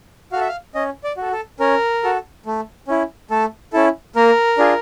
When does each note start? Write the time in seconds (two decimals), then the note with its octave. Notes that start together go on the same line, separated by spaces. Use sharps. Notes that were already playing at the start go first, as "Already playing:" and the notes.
0.32 F#4 F5
0.36 A4 E5
0.48 F5
0.75 C#4 D#5
1.04 D5
1.17 F#4 A4
1.32 A4
1.60 C#4 A#4
2.03 F#4 A4
2.46 A3
2.88 C#4 E4
3.31 A3 A4
3.73 C#4 E4 A4
4.16 A#3 A#4
4.58 D4 F4 G#4